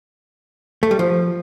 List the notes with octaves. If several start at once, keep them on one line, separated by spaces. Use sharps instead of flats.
A3
G3
F3